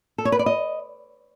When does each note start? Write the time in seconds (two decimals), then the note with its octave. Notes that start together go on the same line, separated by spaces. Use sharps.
0.18 A4
0.25 C#5
0.32 B4
0.39 D5
0.46 D#5